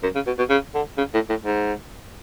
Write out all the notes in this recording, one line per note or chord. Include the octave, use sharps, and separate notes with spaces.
F#2
C#3
B2
B2
C#3
D3
C#3
A2
A2
G#2